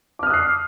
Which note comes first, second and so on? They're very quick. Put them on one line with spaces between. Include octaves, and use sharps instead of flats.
D6 F6 D#6 F#6 C7